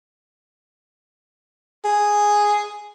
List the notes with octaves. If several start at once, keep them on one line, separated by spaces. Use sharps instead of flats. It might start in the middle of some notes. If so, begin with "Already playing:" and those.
G#4